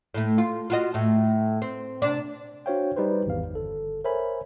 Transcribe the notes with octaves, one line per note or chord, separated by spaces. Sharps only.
A2 A3
F4
F4 F#4 D#5
A2 A3
C4
C3 D4
D4 F#4 C5 C#5 F5 G5
G3 D#4 B4 C5
G#1 E2 F5
G1 A4
A#4 C5 C#5 E5 G#5 B5